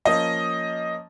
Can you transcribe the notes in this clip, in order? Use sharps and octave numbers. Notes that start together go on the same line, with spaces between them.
F3 A#3 C#4 D#5